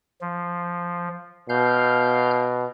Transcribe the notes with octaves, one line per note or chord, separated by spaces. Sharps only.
F3
B2 F5 F6 G6